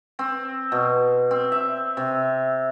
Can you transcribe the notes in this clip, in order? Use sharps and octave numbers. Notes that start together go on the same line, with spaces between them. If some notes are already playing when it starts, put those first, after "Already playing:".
C4
B2
C4
E5
C3